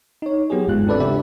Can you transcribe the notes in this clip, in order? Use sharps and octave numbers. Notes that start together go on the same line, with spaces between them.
D#4 C#5
F#3 B3 G4 G#4
G1 D#2 G#2 G#3 F4 F#6
C4 D4 A4 B4 D5
C#3 D4 G4 D5 E5